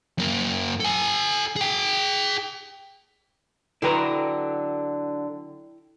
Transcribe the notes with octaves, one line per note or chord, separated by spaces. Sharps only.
F#2 A#3
A4 G#5
G#4 G5
D3 F#3 E4 B4 G5 A#5